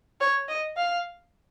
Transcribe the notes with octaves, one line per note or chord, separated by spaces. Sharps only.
C#5
D#5
F5